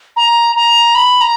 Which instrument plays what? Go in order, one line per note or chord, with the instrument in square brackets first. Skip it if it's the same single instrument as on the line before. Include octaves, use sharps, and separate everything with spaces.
[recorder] A#5
A#5
B5
A#5